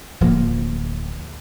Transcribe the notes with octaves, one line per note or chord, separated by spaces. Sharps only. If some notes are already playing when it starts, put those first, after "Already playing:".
D1 F3 A#3